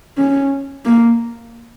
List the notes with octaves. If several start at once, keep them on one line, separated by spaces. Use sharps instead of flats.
C#4
A#3